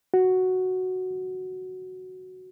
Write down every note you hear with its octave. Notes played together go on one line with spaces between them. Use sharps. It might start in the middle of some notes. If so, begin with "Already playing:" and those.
F#4